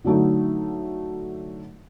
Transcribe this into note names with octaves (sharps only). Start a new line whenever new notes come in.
D3 F#3 A3 D#4